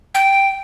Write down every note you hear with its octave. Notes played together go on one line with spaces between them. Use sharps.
G5